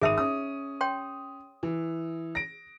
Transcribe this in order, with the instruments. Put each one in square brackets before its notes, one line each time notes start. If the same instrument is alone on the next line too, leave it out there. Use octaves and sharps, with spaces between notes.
[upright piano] G#1 D#6 D#7 [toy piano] G#4 E5
[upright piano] C#4 D#6
[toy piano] C#5 G5 C6
[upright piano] E3
A#6 D7